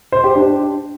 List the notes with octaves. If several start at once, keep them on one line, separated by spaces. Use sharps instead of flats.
C5
G4
D4